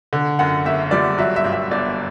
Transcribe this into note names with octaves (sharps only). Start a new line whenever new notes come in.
D3
F#2 F#5
F#1 E5
G3 D5
F#3 E5
E5
G2
E5
G1 D5